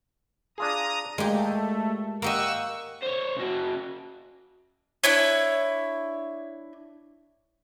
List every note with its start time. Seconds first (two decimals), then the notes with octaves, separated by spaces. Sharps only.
0.58 D4 F4 G#4 A#5 D#6
1.18 A#2 G#3 A3 G4
2.22 A#3 G4 D#5 F#5 C#6 E6
3.03 C5 C#5
3.37 C#3 F#4
5.04 D4 E4 C#5